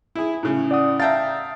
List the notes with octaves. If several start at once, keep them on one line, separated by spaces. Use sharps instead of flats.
E4 G#4
A2 C#3
D5 F#5 D#6
E5 F5 G5 A5 A#5 A6